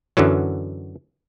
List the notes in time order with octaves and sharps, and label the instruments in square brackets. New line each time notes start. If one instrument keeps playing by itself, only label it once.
[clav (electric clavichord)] F#2 D3 E3 F#3